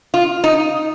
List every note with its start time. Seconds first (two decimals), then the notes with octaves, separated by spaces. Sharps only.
0.14 F4
0.44 D#4